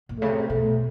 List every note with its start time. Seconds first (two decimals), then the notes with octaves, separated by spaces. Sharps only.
0.09 A#2
0.19 C#3 A3
0.29 C3
0.49 B2 A3